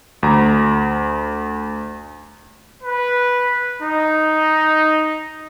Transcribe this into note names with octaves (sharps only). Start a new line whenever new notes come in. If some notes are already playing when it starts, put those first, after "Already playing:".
D2 A#5
B4
D#4